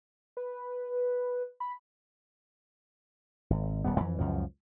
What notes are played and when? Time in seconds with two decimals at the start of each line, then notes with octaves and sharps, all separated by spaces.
0.37 B4
1.60 B5
3.50 G#1
3.84 D#1 G3 B3
3.99 F2 E3
4.19 C#2 F#2 F3